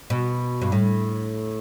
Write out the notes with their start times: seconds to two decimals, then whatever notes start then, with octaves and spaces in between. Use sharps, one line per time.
0.10 B2
0.62 G2
0.72 A2